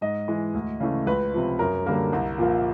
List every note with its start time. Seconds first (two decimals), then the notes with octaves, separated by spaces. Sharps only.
0.01 G#2 D#5
0.28 E3 G#3
0.54 D2
0.80 C#3 E3 A3
1.06 C#2 B4
1.34 C3 F3
1.59 F#2 A#4
1.86 D3 G3 A#3
2.13 C2
2.38 A#2 F3 A#3